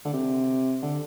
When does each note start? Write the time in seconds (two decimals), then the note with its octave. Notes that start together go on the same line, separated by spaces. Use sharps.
0.05 D3
0.13 C3
0.83 D3